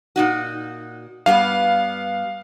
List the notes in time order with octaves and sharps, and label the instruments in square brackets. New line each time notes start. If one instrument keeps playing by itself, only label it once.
[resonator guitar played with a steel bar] A#2 D#4 F#4
[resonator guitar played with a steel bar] G2 G3 B3 [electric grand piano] F5